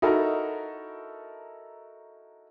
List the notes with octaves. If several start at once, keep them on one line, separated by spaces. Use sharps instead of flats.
D#4 E4 F#4 A4 A#4